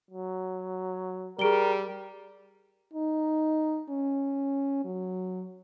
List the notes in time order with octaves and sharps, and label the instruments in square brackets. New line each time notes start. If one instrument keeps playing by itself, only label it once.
[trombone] F#3
[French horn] G3 [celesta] G#4 D7 G7 [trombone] A#4
[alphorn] D#4
C#4
F#3